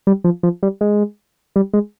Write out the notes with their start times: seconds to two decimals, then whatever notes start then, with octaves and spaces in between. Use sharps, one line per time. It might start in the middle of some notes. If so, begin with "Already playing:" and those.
0.07 G3
0.24 F3
0.43 F3
0.63 G3
0.81 G#3
1.56 G3
1.73 G#3